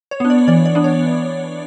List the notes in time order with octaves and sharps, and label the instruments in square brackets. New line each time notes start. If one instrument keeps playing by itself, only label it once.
[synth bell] C#5
B3 D4
D5
E3 D5
D5
B3 D4
C#5